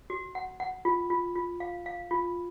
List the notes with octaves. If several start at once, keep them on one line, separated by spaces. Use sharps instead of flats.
F#4
F#5
F#5
F4
F4
F4
F5
F5
F4